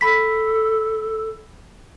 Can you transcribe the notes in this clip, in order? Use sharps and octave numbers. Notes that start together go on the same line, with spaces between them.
A4 B5 B6